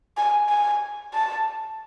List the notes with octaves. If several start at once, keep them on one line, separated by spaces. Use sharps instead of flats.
G#5
G#5
A5